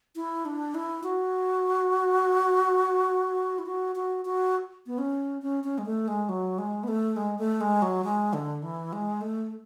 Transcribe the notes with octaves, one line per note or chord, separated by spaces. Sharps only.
E4
D4
E4
F#4
E4
F#4
F#4
F#4
B3
C#4
C#4
C#4
G#3
A3
G#3
F#3
G#3
B3
A3
G#3
A3
G#3
F#3
G#3
D3
E3
G#3
A3